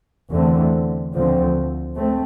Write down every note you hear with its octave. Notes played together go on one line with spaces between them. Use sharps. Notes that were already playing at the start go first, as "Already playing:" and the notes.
E2 D3 A3 C4
D2 D3 F3 C4
A3 C4